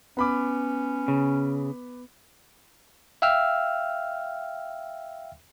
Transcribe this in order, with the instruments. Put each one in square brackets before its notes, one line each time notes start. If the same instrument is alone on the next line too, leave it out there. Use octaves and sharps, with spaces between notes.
[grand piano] B3 B5 D6 [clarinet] C#4
[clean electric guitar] C#3
[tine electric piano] E5 F5 G5 E6 F6